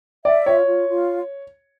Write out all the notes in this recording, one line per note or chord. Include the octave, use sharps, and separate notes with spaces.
D5 E5
F4 C#5
F4
F4